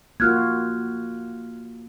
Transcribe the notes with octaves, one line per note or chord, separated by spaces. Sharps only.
A#3 F4 F#4 F6 F#6 G#6